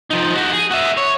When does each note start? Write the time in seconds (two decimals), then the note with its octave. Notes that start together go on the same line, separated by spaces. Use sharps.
0.10 F3 D#4
0.34 F#4 G4
0.53 G#4
0.71 F#4 E5
0.97 C#5